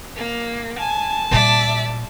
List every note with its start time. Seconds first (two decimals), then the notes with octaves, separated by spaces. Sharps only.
0.16 A#3
0.79 G#5 A5
1.31 A#2 G3 D5 E5